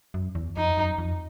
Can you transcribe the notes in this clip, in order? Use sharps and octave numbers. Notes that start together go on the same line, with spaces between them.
F#2
E2
F2 D#4
F#2
F2